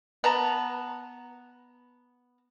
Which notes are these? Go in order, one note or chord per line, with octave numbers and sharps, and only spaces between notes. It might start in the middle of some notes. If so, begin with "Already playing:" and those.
B3 A5 A#5